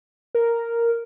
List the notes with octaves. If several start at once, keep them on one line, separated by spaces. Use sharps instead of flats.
A#4